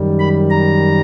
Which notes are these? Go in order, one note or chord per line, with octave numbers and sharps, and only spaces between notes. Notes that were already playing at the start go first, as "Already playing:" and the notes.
Already playing: F#2 D#3 G3
B5
A#5